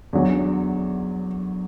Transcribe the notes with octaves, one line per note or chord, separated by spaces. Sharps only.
E2 D3 F#3